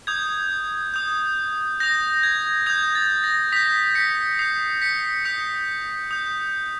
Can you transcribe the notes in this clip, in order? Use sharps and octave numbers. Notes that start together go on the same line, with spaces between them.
D#6 G6 G#6
D#6 G6
D#6 G6 A#6
G#6
D#6 G6 G#6
A6
A#6
D#6 G6 B6
B6 C#7
D#6 G6 C7
B6 C#7
D#6 G6 B6 C#7
D#6 G6